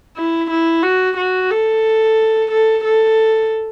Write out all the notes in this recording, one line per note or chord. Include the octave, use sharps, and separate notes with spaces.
E4
E4
F#4
F#4
A4
A4
A4